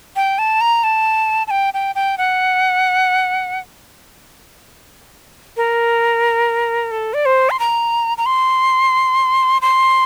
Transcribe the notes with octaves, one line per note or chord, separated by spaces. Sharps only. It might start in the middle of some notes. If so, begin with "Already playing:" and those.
G5
A5
A#5
A5
A5
G5
G5
G5
F#5
A#4
A4
D5
C5
C6
A#5
A#5
C6
C6